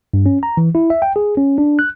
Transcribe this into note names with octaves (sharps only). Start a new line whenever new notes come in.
G2
C#4
A#5
E3
E4
E5
G5
G#4
C#4
D4
F#6